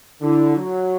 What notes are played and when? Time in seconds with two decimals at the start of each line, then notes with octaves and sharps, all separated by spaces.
0.21 D3 E4
0.57 F#3 F#4